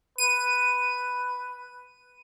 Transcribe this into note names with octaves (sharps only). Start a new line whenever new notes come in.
B4 D#7